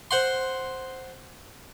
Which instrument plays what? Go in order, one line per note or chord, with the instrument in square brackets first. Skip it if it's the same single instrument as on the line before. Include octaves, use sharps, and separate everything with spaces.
[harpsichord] C5 F#5 C6